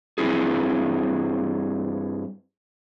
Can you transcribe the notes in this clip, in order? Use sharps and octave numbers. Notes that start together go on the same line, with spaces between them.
G2 B2 C4 E4 G#4